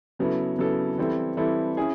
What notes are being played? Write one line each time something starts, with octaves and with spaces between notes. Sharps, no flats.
C#3 F#3 B3 E4 A4
C#3 F#3 B3 E4 A4
E3 G3 C4 E4 A4
E3 G3 C4 E4 A4
C#4 E4 G#4